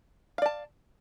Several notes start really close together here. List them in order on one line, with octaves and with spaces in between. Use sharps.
F5 D5 A5